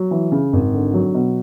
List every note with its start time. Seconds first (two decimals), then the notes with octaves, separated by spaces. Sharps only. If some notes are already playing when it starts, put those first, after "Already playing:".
Already playing: F#3
0.11 E3
0.32 C#3
0.53 G#1
0.73 D3
0.93 F#3
1.14 B2